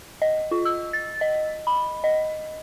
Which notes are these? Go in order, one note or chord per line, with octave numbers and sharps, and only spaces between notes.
D#5
F4
E6
A6
D#5
B5
D#5